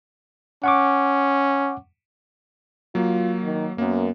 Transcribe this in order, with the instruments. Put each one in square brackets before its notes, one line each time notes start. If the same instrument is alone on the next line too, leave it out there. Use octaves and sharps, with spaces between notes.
[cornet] C#4 [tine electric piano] F#5 C#6 D6
[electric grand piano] F#3 A#3 [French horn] F4
[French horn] D#3
[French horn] F#2 [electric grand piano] A#3 B3